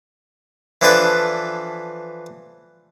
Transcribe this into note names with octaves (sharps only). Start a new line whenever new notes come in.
E3 F3 D4 E4 A4 B4